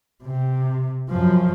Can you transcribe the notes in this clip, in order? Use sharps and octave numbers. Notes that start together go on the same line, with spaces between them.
C3
F#2 F3